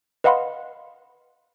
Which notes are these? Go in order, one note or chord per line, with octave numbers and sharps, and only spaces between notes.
B4 D#5 F5 F#5 B5 C6